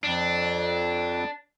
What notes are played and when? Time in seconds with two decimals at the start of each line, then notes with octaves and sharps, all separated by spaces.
0.04 F2 D4